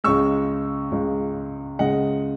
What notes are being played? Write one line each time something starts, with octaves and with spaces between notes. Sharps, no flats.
C#2 C#3 G#3 C#6 E6
C#2 C#3 G#3
C#2 C#3 G#3 D#5 F#5